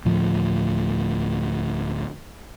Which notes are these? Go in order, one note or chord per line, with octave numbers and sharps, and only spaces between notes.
D2 A2 F3